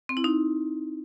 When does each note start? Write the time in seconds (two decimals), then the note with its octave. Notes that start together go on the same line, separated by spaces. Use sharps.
0.09 C4
0.17 E4
0.24 D#4